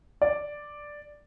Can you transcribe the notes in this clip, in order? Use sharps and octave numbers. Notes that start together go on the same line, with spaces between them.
D5